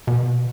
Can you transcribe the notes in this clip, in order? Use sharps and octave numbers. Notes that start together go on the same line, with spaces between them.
B2